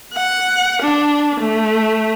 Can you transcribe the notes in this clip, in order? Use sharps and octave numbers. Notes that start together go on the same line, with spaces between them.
F#5
D4
A3